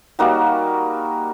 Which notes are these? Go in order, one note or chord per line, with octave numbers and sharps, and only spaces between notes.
G3 A#3 D#4 F#4